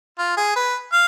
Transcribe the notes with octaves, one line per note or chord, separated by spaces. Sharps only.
F4
G#4
B4
F5